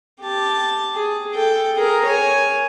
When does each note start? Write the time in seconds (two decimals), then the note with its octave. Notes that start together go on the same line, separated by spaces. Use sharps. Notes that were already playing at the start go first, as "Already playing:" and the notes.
0.22 G4 A5
0.95 G#4
1.34 A4 G5
1.75 G#4 A#4
2.06 C#5 G#5